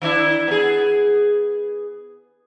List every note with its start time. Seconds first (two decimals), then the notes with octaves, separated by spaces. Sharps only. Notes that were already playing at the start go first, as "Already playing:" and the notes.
0.02 D#3 D4 E4
0.48 B3 G#4